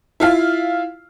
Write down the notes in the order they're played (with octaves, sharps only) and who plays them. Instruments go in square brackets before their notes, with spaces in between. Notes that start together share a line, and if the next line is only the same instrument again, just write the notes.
[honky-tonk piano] E4 F4 F5